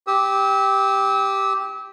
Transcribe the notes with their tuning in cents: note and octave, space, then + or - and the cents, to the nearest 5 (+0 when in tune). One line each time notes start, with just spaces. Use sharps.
G4 +0 E6 -35